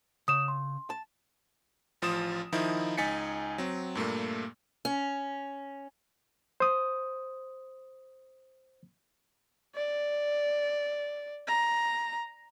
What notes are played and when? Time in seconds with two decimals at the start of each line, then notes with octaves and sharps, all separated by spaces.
0.28 C#3 D#6 E7
0.48 C6
0.90 A5
2.02 A1 F3 F4 D#6 E7
2.52 D#3 F3 D#4 E4
2.98 C#2 D#4 G#5 A6 B6 C#7
3.58 F#3 C4
3.95 G2 A#2 A3 A#3
4.85 C#4
6.60 C5 D#6
9.76 D5
11.48 A#5